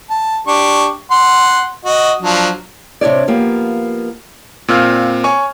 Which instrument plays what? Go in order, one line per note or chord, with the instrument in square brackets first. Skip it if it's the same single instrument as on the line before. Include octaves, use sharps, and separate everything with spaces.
[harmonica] A5
D4 G4 C#6
F#5 C6
F#4 D#5
F3 F#3 D4
[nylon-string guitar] C3 D4 C#5 D5
F3 A#3 B3 G4
[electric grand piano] A#2 C4 F4 F6
C#5 G#5 C#6